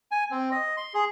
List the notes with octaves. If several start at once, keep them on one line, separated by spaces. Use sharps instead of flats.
G#5
C4
D#5
C6
G#4